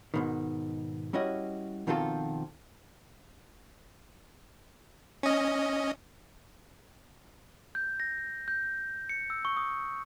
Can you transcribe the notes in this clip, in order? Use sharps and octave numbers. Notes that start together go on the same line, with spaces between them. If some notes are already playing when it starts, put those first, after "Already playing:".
G#2 B2 D#3
G3 C#4 E4 F#4 D#5
B2 D#3 F3 C4 F4 A4
C#4 D#5
G6
A#6
G6
C#7
E6
C#6
D#6